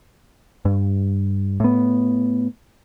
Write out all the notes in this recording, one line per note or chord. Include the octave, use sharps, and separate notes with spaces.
G2
A2 B3